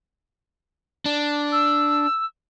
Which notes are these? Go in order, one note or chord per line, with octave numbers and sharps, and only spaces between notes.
D4
E6